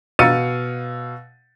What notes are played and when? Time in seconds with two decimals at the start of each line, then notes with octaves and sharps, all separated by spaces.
0.19 B2 F5 E6 A6 C#7 D#7